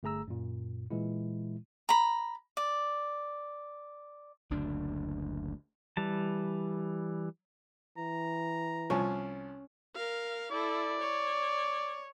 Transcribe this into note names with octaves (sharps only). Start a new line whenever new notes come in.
G1 A3 G#4 A#5 E6
F#2 A#2
A#2 E3 G#3 E4
A#5 B5
D5
F#1 D2 D4
E3 G3 A5
E3 A#5
C2 F3 C#4
A#4 F5
E4 A4 D5
C#5